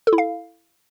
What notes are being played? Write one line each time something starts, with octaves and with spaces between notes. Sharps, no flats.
A4
E4
F5